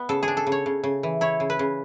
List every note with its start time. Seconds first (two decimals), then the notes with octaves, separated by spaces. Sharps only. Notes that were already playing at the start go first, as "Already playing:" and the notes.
Already playing: B3
0.09 C#3 A4
0.23 G#4
0.28 D4
0.37 A4
0.47 C#3
0.52 C#5
0.66 C#3
0.84 C#3
1.03 E3
1.21 E4 C#5
1.40 C#3
1.50 B4
1.59 C#3